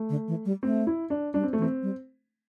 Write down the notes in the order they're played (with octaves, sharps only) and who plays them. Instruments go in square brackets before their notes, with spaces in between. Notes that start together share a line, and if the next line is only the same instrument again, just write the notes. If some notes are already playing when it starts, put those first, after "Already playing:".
Already playing: [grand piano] A3
[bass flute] D3
E3
G3
[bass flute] A3 [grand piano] C4
[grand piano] E4
D4
[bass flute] G3 [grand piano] D4
[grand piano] C4
A3
[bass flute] E3
[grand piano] C4
[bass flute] G3